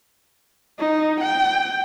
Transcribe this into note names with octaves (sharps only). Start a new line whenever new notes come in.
D#4
G5